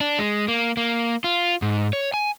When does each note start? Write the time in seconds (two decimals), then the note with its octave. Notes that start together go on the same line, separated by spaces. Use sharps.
0.01 D4
0.19 G#3
0.48 A#3
0.77 A#3
1.24 F4
1.62 G#2
1.93 C#5
2.14 G#5